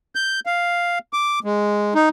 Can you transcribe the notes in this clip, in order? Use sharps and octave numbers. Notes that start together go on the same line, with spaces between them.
G6
F5
D6
G#3
D#4